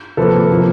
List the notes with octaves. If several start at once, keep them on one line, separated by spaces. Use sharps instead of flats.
C3 F3 A#3 A4 B4
C3 F3 A#3